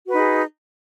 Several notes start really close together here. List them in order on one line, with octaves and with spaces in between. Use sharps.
F#4 B4 D#4 G#4